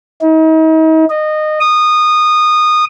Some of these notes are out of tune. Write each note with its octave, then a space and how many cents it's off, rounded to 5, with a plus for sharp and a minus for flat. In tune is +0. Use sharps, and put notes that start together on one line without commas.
D#4 +40
D#5 -20
D#6 -20